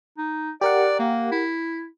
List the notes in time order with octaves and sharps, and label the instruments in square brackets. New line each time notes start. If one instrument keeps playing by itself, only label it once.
[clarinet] D#4
[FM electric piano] G4 A#4 F#5 [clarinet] D5
[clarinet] A#3
E4